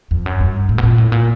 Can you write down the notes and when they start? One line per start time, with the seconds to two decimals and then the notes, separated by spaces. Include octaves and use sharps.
0.11 F2
0.26 F#2
0.40 G2
0.69 A2
0.78 B2
0.83 A#2
0.98 A2
1.12 A#2